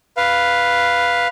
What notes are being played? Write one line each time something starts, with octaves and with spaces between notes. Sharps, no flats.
B4 F5